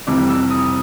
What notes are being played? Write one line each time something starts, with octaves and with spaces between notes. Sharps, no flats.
F1 F2 C3 E3 G3 D6
E6
D#6